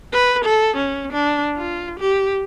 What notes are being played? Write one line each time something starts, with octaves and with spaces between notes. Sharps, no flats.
B4
A4
C#4
D4
F4
G4